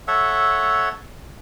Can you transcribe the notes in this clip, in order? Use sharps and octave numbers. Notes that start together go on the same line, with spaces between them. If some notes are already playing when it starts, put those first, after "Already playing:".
A4 C#5 E5 F#5